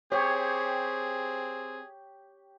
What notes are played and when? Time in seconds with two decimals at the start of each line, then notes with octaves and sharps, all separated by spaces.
0.12 C4 G4 G#4 C#5 G5